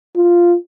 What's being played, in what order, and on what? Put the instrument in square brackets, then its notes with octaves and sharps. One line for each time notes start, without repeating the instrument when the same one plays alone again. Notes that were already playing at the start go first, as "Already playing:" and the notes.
[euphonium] F4